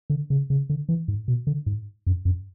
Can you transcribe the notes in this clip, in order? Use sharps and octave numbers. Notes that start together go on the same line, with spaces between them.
D3
C#3
C#3
D3
E3
G#2
B2
D3
G#2
F#2
F#2